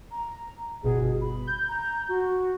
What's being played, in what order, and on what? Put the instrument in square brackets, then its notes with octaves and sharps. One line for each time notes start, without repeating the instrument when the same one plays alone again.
[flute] A#5
[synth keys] G1 B2 [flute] G#4
[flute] B5
[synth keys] G6
[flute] A#5
F#4